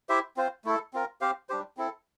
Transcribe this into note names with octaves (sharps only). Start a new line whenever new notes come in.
E4 G4 C5 E5
C4 F4 C5
A3 E4 A4
C4 F4 A#4
C4 G4 C5 F5
G3 D4 G4 C5
C4 E4 A4